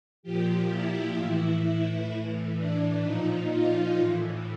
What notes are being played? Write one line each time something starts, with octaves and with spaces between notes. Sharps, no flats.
A#2 F3 G4
E4
A2 E3 E4
A2 E3
D4
A#2 F3 D#4
F4
A2 E3